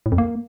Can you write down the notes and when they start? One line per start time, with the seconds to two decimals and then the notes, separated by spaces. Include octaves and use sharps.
0.06 A2
0.12 F2
0.18 A#3